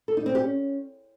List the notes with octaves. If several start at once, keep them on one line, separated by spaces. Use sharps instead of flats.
A4
D#4
C4
G4
C#4